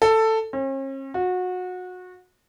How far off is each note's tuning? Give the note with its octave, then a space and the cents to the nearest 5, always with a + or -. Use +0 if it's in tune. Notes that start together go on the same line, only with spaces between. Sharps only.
A4 +10
C#4 -45
F#4 -25